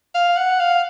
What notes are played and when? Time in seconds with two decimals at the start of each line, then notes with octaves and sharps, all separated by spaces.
0.15 F5
0.37 F#5
0.60 F5